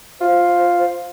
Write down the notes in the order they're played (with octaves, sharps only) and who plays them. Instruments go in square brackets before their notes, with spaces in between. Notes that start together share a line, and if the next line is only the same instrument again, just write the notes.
[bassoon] F4 [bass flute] C5